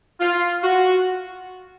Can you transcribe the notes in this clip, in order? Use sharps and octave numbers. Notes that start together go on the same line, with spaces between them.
F4
F#4